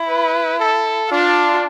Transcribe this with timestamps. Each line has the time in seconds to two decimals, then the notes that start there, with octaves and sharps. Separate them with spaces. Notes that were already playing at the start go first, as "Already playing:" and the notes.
Already playing: E4
0.09 B4
0.59 A4
1.11 D4 F4